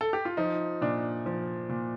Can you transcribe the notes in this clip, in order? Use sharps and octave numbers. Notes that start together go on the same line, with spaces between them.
A4
G4
F4
F3 D#4
A#2 D4
F3
A#2